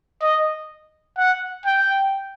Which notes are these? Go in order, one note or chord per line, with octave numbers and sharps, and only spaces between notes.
D#5
F#5
G5